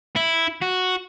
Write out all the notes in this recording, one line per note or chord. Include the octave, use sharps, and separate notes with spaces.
E4
F#4